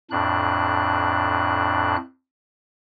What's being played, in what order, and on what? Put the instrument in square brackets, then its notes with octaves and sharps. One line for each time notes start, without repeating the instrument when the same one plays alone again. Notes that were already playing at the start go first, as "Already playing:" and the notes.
[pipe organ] F2 A2 D4 F#6